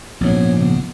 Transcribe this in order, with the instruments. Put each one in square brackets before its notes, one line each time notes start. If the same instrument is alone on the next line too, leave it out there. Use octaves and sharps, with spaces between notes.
[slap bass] A#1 G#2 [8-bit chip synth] B3 C#4 C#5
[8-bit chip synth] C#3 B3